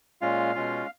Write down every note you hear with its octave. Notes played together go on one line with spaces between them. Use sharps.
A#2 G#3 C#4 F4 F5
B2 G#3 C#4 F4